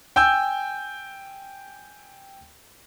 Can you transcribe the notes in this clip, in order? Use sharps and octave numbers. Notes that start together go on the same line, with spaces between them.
G5 G#5 E6 G6